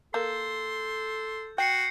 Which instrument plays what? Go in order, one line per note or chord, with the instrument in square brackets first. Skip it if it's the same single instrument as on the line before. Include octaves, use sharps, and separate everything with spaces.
[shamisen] A#3 [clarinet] A4 [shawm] C6 [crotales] G6
[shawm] F#4 [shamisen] G5 [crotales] G6 C7 C#7